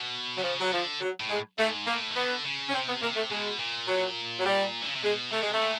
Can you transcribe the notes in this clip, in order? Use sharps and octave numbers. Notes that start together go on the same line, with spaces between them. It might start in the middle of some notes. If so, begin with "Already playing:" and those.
Already playing: B2
C3 F#3
C#3 F3
F#3
D3 F3
F#3
A2
G#3
G#2 A3
A2 A#3
D#3
D3 B3
C#3
C#4
C3 C4
B3
C3 A#3
A3
B2 G#3
A#2
F#3
F#3
G3
D3
C#3
C3
B2 G#3
C3 A3
G#3
A3
A#2